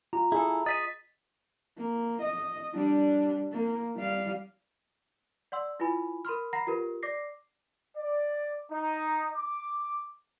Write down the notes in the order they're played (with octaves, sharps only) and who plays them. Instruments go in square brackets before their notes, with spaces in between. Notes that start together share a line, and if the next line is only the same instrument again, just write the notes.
[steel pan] F4 [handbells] A#5
[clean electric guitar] E4 A4 [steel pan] G#4
[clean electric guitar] D#5 [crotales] A6 B6 D#7
[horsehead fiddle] A#3
D#5
G3 D4
A#3
G3 F5
[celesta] D5 F#5 C6 E6
E4 F4 B4 G#5 B5
A#4 B5 C6 F6
F#5 A#5 B5 A#6 C7
F4 G4 A#4 B4
D5 D6 A#6 C7
[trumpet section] D5
D#4
D6